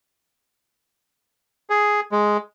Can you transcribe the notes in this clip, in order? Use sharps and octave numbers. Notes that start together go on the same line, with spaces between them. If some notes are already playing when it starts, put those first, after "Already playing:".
G#4
G#3